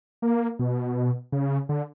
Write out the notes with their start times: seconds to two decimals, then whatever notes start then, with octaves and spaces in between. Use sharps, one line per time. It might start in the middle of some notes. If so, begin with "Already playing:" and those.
0.22 A#3
0.59 B2
1.32 C#3
1.69 D3